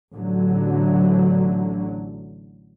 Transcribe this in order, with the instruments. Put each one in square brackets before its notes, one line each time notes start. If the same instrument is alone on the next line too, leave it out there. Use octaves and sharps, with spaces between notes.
[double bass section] A1 D3 F#3